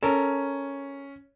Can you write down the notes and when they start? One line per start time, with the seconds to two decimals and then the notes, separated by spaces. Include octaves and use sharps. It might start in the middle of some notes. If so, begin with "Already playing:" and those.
0.03 C#4 A4 A#4